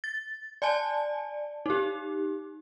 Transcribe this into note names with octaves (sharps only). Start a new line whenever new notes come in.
A6
D5 G#5 A5
D#4 G4